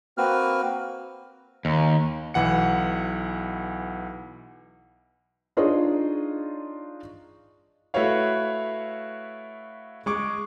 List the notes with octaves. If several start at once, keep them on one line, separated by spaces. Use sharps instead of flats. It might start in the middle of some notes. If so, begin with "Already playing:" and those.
A#3 C4 F#4 B4 F6
D#2
B1 E3 F#5 C#7
D4 D#4 F4 G#4 C#5 D#5
A3 E4 F#4 B4 C#5 F5
G#3 C#6 D6